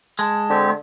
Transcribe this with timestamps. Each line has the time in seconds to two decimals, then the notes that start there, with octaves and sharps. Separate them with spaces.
0.19 G#3 A5
0.50 D3 C4 G4